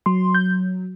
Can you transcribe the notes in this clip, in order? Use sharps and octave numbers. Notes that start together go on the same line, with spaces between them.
F#3 C6
G6